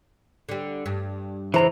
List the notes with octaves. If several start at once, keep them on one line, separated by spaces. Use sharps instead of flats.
D3 G3
G2
F2 C#3 E3 C5 A#5